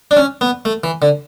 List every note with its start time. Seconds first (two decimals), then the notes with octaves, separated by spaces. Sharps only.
0.11 D4
0.17 C#4
0.41 B3
0.65 A3
0.84 E3
1.02 D3